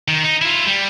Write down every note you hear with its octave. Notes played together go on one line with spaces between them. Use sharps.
D#3
D#4
E4 F4
G3